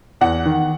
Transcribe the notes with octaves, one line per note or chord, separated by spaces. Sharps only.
E2 F#5
D#3